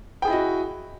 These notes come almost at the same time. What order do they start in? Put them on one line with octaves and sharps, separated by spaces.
G5 G#4 E4 D#5 F#4